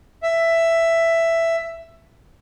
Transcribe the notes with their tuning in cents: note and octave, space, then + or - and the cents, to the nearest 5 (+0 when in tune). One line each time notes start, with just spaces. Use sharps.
E5 +10